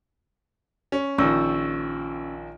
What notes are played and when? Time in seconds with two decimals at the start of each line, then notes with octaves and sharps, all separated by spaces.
0.92 C#4
1.18 A#1 D#3 F3 C#4 C#6 E6